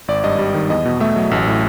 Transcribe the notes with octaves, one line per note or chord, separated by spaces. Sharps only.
G#1 D5
G2 D#5
G3
D#3
E2 D#5
B2
A3 E5
F#3
A1
A2